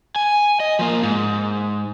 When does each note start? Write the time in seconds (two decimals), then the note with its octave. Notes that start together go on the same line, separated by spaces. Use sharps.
0.16 G#5
0.60 D#5
0.79 F3 A#3
1.03 G#2